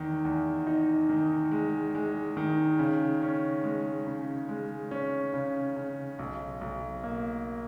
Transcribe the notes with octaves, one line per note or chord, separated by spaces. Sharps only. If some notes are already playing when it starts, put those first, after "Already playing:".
Already playing: E2 D#3
E2
D#4
D#3
G#3
G#3
D#3
C#3
C#4
G#3
C#3
G#3
C#4
C#3
C#3
B1
B1
A#3